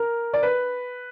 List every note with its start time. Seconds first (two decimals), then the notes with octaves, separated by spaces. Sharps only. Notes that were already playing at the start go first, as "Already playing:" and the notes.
Already playing: A#4
0.34 D5
0.43 B4